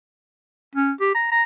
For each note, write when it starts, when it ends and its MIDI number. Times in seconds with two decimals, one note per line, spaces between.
0.75 0.92 61
1.00 1.13 67
1.15 1.30 82
1.32 1.44 82